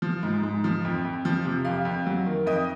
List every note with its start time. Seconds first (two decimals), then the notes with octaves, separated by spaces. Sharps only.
0.02 F3
0.23 G#2
0.43 G#2
0.64 F3
0.84 F2
1.04 F2
1.25 F3
1.45 C3
1.65 F2 F5
1.85 F2
2.06 F#3
2.26 D#3
2.46 F2 D#5